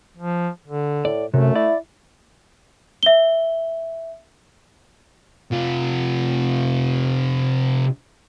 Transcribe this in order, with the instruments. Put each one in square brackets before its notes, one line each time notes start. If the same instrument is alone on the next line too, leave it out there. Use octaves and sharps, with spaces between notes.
[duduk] F3
D3
[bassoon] A2 [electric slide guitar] D5
[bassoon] F#2 [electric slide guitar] C3 [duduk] A3
[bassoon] E4 [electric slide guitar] D5
[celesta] E5 G7
[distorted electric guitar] C3 F4